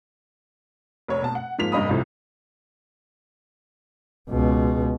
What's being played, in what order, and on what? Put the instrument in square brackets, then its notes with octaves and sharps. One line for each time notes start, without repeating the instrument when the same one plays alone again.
[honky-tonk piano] F1 C#5
B2 A5
F#5
G#2 F3 A#3 B6 F7
F1 G2 D#5 B5 D#6
C2 A2 C3 F3
[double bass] C#2 B2